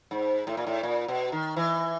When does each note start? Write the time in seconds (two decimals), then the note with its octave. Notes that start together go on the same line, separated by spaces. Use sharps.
0.11 G#2
0.47 A2
0.57 A#2
0.67 A2
0.83 A#2
1.08 B2
1.32 D#3
1.56 E3